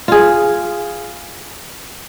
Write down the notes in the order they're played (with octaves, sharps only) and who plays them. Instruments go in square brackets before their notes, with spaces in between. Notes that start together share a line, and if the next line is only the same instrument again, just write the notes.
[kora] F4 G#4